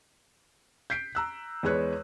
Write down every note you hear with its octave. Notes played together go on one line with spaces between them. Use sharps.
G6 B6 C7 D7
A#5 E6 F#6
E2 G#3 G#4 B4 C#5 F#6